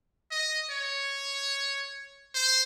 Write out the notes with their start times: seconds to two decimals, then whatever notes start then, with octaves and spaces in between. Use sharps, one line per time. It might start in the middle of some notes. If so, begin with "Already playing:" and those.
0.31 D#5
0.71 C#5
2.34 C5